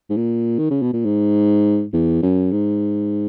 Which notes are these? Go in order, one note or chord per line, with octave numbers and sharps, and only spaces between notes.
G#2
A#2
D#3
C#3
B2
A#2
G#2
E2
F#2
G#2